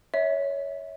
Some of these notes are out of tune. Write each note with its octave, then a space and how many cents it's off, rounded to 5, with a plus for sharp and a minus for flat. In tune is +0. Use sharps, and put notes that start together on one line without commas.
C#5 +10 E5 -30